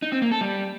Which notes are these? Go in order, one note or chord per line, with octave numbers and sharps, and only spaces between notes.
D#4
C4
A#3
A4
G3